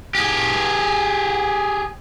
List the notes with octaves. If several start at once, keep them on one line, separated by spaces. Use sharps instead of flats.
G4 G#4